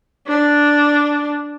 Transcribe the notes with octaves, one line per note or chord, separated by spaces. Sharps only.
D4